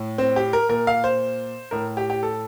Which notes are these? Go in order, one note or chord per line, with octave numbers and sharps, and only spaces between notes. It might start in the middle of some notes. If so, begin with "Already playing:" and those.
Already playing: A2
C4
G4
A#4
A#2 A#4
F5
C5
A2 A#4
G4
G4
A4